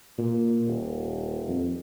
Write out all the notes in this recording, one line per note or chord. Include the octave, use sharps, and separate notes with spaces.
A#2
D#1
F2